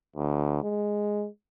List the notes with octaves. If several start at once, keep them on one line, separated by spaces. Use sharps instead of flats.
D2
G#3